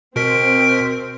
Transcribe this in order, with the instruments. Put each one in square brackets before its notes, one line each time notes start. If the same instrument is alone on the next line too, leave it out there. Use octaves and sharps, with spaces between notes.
[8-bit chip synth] B2 A#4 B6 [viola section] C4 [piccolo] D7